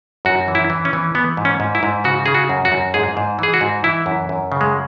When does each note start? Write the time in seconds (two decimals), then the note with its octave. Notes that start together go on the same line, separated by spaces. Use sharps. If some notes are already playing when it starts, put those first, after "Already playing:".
0.25 F#2 F#4
0.48 E3
0.55 E4
0.70 E3
0.85 C#4
0.93 E3
1.15 E3 B3
1.37 G#2
1.45 C#4
1.60 G#2
1.75 E4
1.83 G#2
2.04 C#3 F#4
2.26 C#3 G#4
2.34 F#4
2.49 F#2
2.65 F#4
2.72 F#2
2.94 G#2 G#4
3.17 G#2
3.39 E3 G#4
3.54 F#4
3.61 G#2
3.84 E3 E4
4.06 F#2
4.29 F#2
4.52 C#3
4.61 G#3